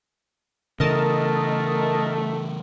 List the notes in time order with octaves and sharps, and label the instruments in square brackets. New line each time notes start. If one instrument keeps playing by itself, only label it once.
[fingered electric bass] C#3 E3 [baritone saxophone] A3 [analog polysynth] A#4 D#5 A5